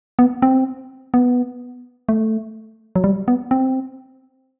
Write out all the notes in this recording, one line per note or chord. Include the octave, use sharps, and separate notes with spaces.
B3
C4
B3
A3
F#3
G3
B3
C4